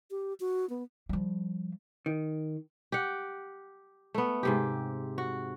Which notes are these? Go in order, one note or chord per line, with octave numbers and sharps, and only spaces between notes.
G4
F#4
B3
F3 G3
D#3
G4 F#5
A3 B3
G#2 C3 G4
F#4